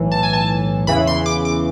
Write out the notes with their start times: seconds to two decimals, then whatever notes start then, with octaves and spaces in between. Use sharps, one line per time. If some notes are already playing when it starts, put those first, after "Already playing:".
Already playing: B1 A2 E3
0.12 A5
0.23 G#5
0.33 A5
0.87 E2 C#3 E3 B5
1.07 C6
1.26 D6
1.45 D6